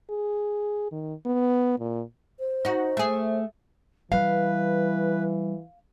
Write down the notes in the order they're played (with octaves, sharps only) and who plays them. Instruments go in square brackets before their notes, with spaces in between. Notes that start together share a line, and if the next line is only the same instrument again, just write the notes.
[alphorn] G#4
D#3
B3
A#2
[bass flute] C5
[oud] D#4 F#4
A3 G#4
[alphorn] E3 [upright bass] G3 [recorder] B4 [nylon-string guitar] F5